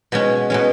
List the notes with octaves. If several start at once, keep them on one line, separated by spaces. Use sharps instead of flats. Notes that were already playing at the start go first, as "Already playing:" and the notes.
B2 G#3 C#4
B2 G#3 C#4